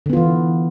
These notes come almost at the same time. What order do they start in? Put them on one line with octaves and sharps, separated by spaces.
D3 B3 F4 E3